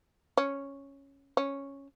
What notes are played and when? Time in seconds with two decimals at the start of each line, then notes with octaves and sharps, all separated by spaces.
0.37 C#4
1.37 C#4